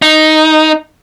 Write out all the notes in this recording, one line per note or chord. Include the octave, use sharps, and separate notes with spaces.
D#4